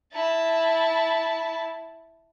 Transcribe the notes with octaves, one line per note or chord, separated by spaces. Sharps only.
E4 A5